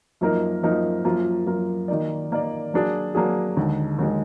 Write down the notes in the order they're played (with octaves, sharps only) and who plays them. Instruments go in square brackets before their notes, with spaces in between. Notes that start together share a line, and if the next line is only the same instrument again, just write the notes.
[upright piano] F#2 F3 A#3 D#4 A#4
F#2 F3 A#3 D#4 A#4
F#2 F3 A#3 F4 A#4
F#2 F3 A#3 F4 A#4
D#3 A#3 D#4 A#4 D5
D#3 A#3 D#4 A#4 D5
F#3 A#3 D4 G#4
F#3 A#3 D4 G#4
D#2 D3 G#3
D#2 D3 G#3